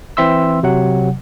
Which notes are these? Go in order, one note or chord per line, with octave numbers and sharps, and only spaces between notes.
E3 C4 E5 C6 E6
C3 F#3 F#5